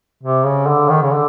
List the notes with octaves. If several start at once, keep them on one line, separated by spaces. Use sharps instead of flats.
C3
C#3
D3
D#3
C#3
D3